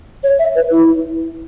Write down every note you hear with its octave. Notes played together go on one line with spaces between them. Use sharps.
C#5
E5
B4
E4